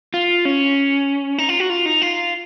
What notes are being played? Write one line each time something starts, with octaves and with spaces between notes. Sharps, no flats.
F4
C#4
D#4
F4
F#4
F4
D#4
F4